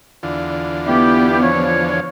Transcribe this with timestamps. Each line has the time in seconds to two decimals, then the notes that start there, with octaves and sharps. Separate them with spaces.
0.23 E2 D3 F4
0.86 B3 E4 G4
1.41 F3 C#5